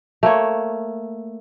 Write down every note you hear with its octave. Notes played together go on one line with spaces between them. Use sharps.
A3 A#3 C#5